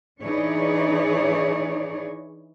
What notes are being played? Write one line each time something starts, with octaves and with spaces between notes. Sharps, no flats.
E3 D4 D#4 G#4 C#5 D5